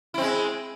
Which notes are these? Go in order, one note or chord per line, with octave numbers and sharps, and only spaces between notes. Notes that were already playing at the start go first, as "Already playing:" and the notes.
G#3 C4 E4